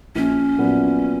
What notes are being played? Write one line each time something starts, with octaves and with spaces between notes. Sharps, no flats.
A#1 C#4
A#2 F#3 B3